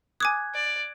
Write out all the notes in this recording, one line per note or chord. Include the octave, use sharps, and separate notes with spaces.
G#5 D6 D#6 F#6 G#6
D5